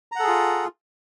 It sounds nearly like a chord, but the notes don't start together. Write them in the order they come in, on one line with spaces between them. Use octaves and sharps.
A#5 F#5 A4 G#4 F4